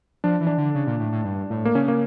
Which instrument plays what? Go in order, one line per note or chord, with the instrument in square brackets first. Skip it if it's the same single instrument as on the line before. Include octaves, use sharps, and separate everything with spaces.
[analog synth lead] F3 [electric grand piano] D4
[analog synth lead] E3
[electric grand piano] D4
[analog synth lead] D3
C#3
A#2
A2
A2
G2
A2
[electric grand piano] A#3
[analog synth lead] C#3 [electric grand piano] C#4
[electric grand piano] A#3